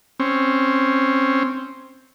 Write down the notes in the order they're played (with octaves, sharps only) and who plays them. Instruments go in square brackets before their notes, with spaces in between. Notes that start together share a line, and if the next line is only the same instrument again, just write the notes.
[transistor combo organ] C4 C#4